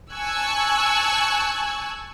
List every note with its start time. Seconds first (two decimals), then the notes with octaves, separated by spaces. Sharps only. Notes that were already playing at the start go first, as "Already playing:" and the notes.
0.13 G#5 A5 C#6 E6 F#6 G#6